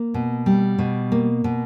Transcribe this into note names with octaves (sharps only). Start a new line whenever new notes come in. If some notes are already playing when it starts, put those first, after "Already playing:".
Already playing: A#3
B2
G3
B2
A#3
B2